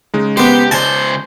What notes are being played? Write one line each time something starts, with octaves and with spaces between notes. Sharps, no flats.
C#3 G#3 D#4
B3 G4 C5
C#2 C5 G#5 A5